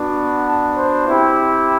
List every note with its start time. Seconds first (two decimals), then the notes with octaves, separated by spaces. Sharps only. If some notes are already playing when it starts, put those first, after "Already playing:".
Already playing: B3 D4 F#4
0.46 A5
0.76 C5
1.07 C4 E4 G4